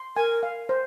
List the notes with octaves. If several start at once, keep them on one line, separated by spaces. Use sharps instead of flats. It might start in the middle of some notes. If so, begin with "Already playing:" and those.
Already playing: C6
A#4 G#5
F5
C5